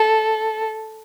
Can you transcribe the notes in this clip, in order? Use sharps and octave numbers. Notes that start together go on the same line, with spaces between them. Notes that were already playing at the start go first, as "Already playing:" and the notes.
Already playing: A4